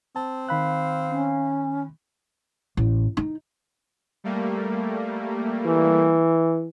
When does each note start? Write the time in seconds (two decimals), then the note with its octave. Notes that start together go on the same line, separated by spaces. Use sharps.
0.16 C4 A5
0.49 D#3 F5 B5 F#6
1.09 C#4
2.77 A1
3.17 D#4
4.24 G3 A3 A#3
5.66 E3